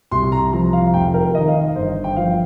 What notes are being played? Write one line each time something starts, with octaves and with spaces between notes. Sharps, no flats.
C2 C6
A#5
F3 A#5
F5
F1 G5
A#4
D#3 D#5
F5
D#5
G1 C5
G5
F3 F5